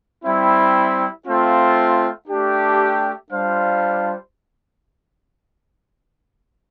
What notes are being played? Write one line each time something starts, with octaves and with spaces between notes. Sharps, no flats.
G3 C4 E4
A3 C4 F4
A3 D4 G4
G3 D4 F4 C5 F5